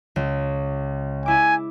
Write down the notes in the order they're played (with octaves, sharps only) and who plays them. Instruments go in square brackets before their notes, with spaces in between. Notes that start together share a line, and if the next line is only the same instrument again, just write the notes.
[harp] C#2
[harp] E4 D6 [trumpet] G#5